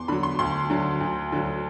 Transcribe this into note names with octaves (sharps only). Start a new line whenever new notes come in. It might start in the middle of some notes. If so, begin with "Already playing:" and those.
Already playing: E2 C6 D6
D3 F#3 B5
C6
D2 C6
D3 F#3
D2
D3 F#3